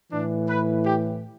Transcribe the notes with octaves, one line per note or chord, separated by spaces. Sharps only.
A2 E3 D4
B4
G4